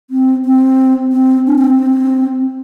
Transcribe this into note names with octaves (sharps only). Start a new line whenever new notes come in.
C4
C4
C4
D4
C4
C4